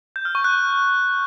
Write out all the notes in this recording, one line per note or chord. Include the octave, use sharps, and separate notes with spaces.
G6
F6
C#6
F#6